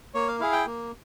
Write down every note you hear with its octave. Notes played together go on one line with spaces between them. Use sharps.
A#3 C#5
F5
E4 G#4 F5
G5
A#3